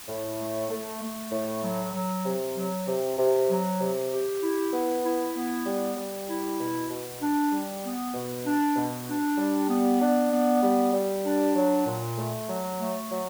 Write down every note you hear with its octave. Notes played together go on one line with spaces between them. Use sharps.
A2
A3
A3
A3
A2
F#3
F#3
C3
F#3
C3
C3
F#3
C3
G4
E4
B3
E4
B3
G3
G3
E4
B2
B2
D4
G3
B3
B2
D4
B2
D4
G3
B3
D4
B3
G3
G3
D4
F#3
A#2
A3
F#3
A3
F#3